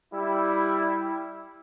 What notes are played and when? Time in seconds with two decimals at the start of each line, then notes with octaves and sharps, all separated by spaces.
0.14 G3 E4